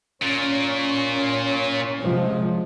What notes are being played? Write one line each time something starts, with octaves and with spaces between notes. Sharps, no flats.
A#2 C#4
C3 F3 G#3